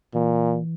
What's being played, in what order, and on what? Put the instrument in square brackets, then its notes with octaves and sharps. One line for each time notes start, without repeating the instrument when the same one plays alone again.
[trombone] A#2 [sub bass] E3